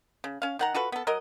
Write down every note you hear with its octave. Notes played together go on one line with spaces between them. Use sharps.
C#3
C#4 F5
D#3 F#5 A#5
F4 F#4 A4 B4
B3 A4
F#3 A#4 D#5